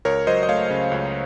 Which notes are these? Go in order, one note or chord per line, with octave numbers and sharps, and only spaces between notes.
C#2 A#4 C#5
F#3 C5 D#5
D#5
A3 C#5 F5
C#3
C#2